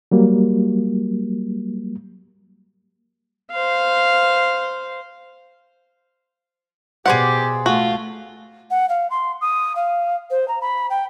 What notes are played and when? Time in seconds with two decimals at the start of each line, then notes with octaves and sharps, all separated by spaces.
0.11 F#3 G3 A#3
3.51 C5 F5
7.06 B2 G4 G#4 C5 D5 F#5
7.66 A3 F4 F#4
8.70 F#5
8.89 F5
9.10 C6
9.41 D#6
9.75 F5
10.30 C5
10.48 A#5
10.61 B5
10.90 G5